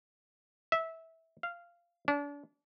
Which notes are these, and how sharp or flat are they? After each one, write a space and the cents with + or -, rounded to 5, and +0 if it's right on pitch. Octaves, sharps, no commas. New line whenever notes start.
E5 -15
F5 -15
D4 -35